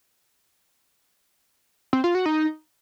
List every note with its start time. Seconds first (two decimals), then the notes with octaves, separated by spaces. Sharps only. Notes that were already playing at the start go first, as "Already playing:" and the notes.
1.93 C4
2.04 F4
2.15 F#4
2.26 D#4